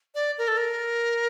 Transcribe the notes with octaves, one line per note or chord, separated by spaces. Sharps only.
D5
A#4
A4
A#4